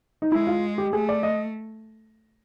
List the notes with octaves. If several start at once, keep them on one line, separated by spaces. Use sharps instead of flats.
D#4
G#3 E4
F4
G4
A3 G#4
D5
D#5